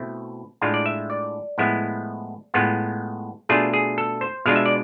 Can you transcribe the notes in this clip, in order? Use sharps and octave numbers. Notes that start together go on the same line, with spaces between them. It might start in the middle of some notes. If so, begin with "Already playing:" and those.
Already playing: B2 A3 C4 E4
A2 G#3 D4 F4 F5
D5
E5
D5
A2 F3 G#3 B3 E4
A2 G#3 B3 F4
B2 A3 D4 F4 G#4
G#4
A4
C5
B2 G#3 D4 F4 F5
E5
D5